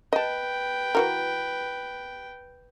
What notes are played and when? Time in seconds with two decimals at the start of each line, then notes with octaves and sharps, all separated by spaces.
0.13 B4 D#5 G5 A5
0.95 E3 F#4 A#4